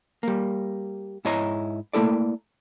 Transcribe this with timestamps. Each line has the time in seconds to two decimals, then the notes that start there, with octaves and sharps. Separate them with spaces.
0.23 G3 A#3
1.25 G#2 E4 C#5 D#5 A#5
1.93 A3 A#3 E4 A4 D5